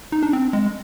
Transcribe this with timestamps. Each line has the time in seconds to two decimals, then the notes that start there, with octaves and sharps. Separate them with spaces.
0.12 D#4
0.23 D4
0.33 C4
0.53 G#3